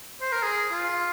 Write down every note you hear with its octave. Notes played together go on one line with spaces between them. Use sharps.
C5
A#4
G#4
F4